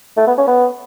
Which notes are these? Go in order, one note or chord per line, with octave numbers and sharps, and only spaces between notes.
A3
B3
C#4
B3